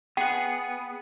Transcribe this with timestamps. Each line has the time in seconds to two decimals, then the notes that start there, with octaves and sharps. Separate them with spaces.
0.17 B3 G#4 F#5 G5